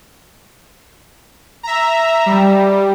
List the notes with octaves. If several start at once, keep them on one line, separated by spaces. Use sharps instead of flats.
E5 A#5
G3